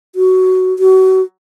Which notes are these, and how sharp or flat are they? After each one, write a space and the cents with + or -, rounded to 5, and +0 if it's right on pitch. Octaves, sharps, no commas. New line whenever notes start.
F#4 +10
F#4 +30